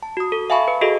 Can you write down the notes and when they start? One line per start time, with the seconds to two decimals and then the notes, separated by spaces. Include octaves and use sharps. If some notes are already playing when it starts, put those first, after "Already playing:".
0.03 A5
0.17 F#4 D#6
0.32 A4
0.50 E5 F5 G#5 A5 B5 C#6
0.68 B4
0.81 F#4 G#4 A4 D#5